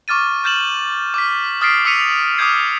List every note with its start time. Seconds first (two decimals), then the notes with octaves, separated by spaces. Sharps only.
0.08 C#6 D6 F6 A6 D#7
0.44 F6 G6 A6 E7 F#7
1.14 D6 F6 B6
1.61 D#6 F6 A6 B6 C7 D7
1.85 D6 E6 B6 C#7 D#7 F7
2.38 D6 D#6 F6 G6 G#6 C7